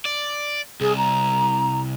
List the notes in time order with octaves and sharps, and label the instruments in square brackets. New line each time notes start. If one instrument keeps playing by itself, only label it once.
[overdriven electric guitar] D5
[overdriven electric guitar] C2 [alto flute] G#4
[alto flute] A#5